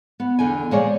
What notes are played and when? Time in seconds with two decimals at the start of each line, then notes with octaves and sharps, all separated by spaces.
0.20 B3
0.39 E2 D3 G5 G#5
0.71 A#2 F3 G#3 G#4 C#5 D5